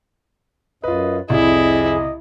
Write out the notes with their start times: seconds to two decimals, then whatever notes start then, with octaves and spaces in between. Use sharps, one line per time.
0.84 F#2 F4 B4 D#5
1.30 C2 F2 E4 G#4 D#5